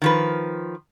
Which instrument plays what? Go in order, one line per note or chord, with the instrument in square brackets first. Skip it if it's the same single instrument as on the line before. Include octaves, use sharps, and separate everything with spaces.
[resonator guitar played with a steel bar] D#3 F3 B4